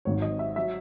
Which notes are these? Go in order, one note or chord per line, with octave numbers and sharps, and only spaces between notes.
G#1 G#2 D#3 F#3 C#5
D#5
E5
F#3 E5